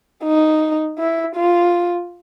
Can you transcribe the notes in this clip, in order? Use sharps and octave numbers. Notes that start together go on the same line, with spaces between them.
D#4
E4
F4